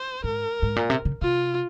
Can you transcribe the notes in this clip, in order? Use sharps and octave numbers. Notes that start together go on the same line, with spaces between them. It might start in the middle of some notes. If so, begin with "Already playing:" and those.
Already playing: C5
G#2 A#4
G#2
A#2
C3
C#3
C3 F4